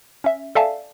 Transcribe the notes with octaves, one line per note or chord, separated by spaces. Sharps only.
C#4 E5
A4 D5 E5 F5 G#5 A5